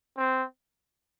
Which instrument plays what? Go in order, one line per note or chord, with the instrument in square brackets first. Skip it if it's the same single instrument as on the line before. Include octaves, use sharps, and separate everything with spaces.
[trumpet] C4